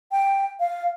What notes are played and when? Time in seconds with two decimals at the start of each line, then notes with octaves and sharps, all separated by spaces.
0.12 G5
0.60 F5